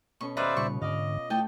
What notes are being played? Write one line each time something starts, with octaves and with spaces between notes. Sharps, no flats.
B2 C#4 A4 C#6
D#2 D#4 B4 C5 D5 E5 F5 B5
A#2 C#3 G3 F4 C#6
G#2 D3 D5 D#5 F5
A3 E4 D#5 G5 A5